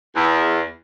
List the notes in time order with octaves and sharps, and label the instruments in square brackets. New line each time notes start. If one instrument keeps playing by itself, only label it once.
[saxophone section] E2